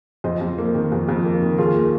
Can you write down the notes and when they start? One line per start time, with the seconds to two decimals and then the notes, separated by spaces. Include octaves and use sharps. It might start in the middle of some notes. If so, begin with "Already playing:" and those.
0.24 F2 C5 D#5
0.41 F2
0.58 A#3
0.75 D#3
0.92 F2
1.09 F2
1.25 A#3
1.42 D#3
1.58 D#2 F4 G#4
1.75 A#3